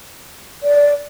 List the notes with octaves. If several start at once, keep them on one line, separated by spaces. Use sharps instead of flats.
D5